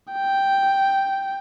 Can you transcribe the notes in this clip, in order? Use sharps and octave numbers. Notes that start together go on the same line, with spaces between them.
G5